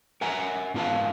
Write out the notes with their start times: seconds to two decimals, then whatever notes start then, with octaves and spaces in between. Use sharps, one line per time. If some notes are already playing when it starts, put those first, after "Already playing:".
0.21 A#4 E5 F#5 G#5 A#5
0.74 G#2 B3 F4 A#4 F5 A5